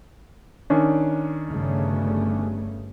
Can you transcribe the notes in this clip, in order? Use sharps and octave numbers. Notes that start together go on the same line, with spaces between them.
D#3 C#4 D4
G1 C#3 A3